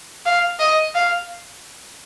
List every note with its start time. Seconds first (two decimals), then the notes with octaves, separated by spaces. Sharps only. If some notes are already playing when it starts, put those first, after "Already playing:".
0.26 F5
0.59 D#5
0.95 F5